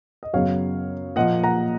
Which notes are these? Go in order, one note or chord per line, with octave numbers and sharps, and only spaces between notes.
D#5
F#2 C#3 F#3 B3 C#5 F5
A#2 F3 A#3 D#5 F#5
F#5 A#5